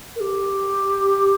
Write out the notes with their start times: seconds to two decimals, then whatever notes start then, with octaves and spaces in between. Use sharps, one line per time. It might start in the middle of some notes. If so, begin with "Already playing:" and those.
0.16 A#4
0.20 G4